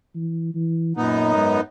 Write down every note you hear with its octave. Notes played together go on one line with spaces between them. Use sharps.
E3
E3
F#2 A#2 B3 D#4
G#2